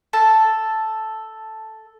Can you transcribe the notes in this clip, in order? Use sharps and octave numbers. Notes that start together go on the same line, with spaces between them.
A4 A5